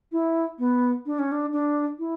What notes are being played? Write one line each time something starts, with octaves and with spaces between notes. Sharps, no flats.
E4
B3
D4
C#4
D4
D4
E4